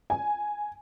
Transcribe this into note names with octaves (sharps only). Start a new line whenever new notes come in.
G#5